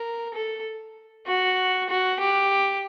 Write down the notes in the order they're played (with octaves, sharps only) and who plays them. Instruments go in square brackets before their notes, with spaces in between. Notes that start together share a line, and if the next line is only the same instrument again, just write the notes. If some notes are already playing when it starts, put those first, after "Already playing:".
Already playing: [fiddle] A#4
A4
F#4
F#4
G4